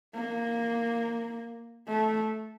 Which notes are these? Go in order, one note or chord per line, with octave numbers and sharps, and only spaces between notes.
A#3
A3